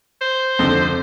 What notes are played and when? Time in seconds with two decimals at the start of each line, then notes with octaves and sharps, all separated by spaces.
0.21 C5
0.59 F2 D3